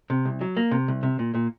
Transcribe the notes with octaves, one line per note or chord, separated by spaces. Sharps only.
C3
C2
F#3
A#3
C3
C2
C3
A#2
A#2